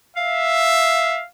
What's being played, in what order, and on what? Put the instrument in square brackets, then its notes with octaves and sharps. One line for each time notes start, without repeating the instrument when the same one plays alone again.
[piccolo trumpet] E5 [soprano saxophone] F5